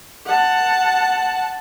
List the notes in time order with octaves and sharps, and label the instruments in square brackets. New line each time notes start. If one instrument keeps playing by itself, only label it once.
[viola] F#5 A5